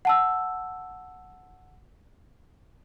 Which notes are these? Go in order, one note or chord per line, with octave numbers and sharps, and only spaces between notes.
F#5 A5 E6